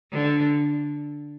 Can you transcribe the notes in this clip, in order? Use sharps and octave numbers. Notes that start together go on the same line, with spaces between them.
D3